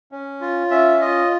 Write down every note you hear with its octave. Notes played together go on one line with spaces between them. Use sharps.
C#4
F4
C#4 E5
F4 D#5